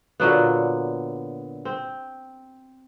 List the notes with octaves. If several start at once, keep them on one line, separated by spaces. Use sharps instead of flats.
A#2 D3 F#3 B3
C4